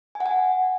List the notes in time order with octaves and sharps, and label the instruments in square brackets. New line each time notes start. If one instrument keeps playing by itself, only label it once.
[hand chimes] G#5
F#5
G#5